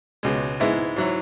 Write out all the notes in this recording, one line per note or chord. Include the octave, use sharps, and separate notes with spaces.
C#2 B2 G#3
G#2 G#3 B3 E4
G#2 F#3 E4